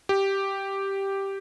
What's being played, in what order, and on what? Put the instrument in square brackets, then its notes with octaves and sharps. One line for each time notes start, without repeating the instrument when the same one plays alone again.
[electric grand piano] G4